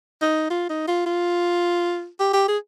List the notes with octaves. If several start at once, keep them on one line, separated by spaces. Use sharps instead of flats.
D#4
F4
D#4
F4
F4
G4
G4
G#4